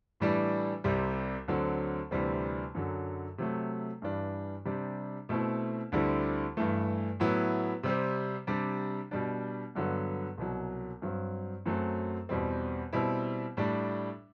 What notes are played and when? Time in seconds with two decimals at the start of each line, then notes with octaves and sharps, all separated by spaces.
0.20 A2 E3 G3 D4
0.84 C2 C3 G3
1.48 D2 D3 F#3 C4
2.11 D2 C3 E3 G3 C4
2.75 F#2 D3 F#3
3.38 C3 F#3 A3
4.02 G2 E3 G3 D4
4.65 C3 G3 D4
5.29 B2 A3 C4 E4
5.92 D2 D3 G3 C4 E4
6.57 G2 E3 A3
7.20 A2 F#3 B3 E4
7.83 C3 G3 C4
8.47 C3 G3 D4
9.11 B2 G3 D4
9.75 G2 D3 F#3 B3
10.38 C2 B2 F#3
11.02 G2 F#3 C4
11.66 F#2 F#3 A3 C4
12.29 E2 B2 G3 C4
12.93 B2 G3 C4 E4
13.57 A2 G3 D4